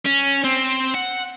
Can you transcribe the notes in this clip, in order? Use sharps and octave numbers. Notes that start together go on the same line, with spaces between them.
C#4
C4
F#5